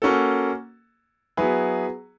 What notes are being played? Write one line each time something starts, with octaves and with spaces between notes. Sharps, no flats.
A#3 C#4 F#4 A4
F#3 B3 E4 G#4 B4